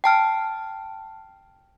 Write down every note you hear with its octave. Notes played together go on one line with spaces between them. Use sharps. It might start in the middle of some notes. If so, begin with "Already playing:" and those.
G5 A5 F6